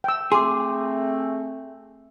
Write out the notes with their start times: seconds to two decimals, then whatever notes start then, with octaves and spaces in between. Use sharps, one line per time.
0.04 G5 E6
0.32 A3 C4 G#4 C6 D6